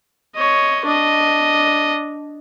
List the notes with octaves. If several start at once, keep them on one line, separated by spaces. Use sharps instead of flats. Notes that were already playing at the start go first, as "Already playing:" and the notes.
C#5 D#5
D4 D#5